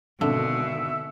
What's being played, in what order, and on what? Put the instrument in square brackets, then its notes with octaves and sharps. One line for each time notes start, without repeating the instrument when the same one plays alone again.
[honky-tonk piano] G#1 [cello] B2 [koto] D3 [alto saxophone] E5